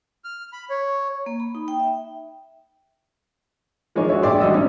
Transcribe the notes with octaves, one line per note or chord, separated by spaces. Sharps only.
F6
B5
C#5
A#3
B5
D#4
G5
E5
F3 G#3 D4 D#4 C#5
F#4 G#4 C#5 E5
A#1 G#3 G4 D5 E5 C6
A1 G3 F#4 D#5 E6
C4 C#4 D#4